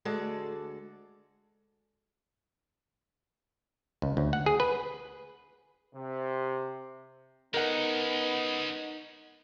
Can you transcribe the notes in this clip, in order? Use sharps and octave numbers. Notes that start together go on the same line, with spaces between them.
D2 G#3 F#4 A4 D5
C#2
D2
F#5
G#4
B4
C3
G#3 B3 C#4 D#4 A#4 F#5